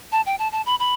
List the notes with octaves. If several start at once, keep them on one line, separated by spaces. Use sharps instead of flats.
A5
G5
A5
A5
B5
B5